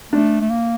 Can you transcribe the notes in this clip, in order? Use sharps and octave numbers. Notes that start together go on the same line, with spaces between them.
A3 D4
A3
A#3